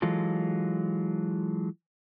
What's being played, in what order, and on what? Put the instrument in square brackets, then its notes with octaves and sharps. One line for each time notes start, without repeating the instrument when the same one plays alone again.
[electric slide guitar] E3 F#3 G#3 F4 A4